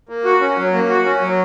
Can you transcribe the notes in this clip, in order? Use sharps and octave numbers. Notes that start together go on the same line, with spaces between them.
A#3
F#4
C#4
F#3
A#3
F#4
C#4
F#3